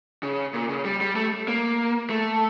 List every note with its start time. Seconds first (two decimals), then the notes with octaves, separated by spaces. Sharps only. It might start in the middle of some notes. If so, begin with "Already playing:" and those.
0.23 C#3
0.54 A#2
0.69 C#3
0.85 G3
1.01 G3
1.16 A3
1.48 A#3
2.10 A3